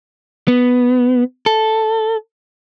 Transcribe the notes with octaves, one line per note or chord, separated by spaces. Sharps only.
B3
A4